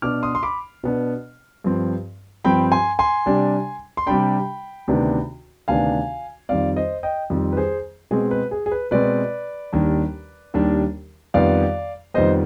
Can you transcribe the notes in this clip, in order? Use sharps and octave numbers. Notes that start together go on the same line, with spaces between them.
B2 B3 D4 D6 F6
C6 D#6
C6
B5 D6
B2 B3 D4
G2 F3 C4
G2 F3 C4 G5 B5
G#5 C6
G#5 C6
C3 G3 D4
C6
C3 G3 D4 G5 B5
D2 C3 D#3 B3 D4
D2 C3 D#3 B3 D4 F5 G#5
F2 D#3 G3 C4 D5 F5
C5 D#5
D#5 G5
F2 D#3 G3 C4
B4
G#4 C5
B2 G#3 C4 G#4
B4
G#4
G#4
B4
B2 G#3 C4 B4 D5
D#2 D#3 G3 D4
D#2 D#3 G3 D4
F2 D#3 G3 B3 D5 F5
F2 D#3 G3 B3 C5 D#5